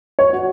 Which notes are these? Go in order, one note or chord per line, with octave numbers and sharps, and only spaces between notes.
C#5
F#4